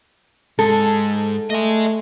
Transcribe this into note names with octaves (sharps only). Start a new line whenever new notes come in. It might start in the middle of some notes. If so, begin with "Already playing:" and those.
G#2 A4
A3 D#5 G#5